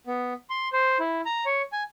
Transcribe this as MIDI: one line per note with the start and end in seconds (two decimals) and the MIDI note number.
0.07 0.33 59
0.50 0.68 84
0.73 0.98 72
1.00 1.21 64
1.26 1.45 82
1.46 1.62 73
1.73 1.83 80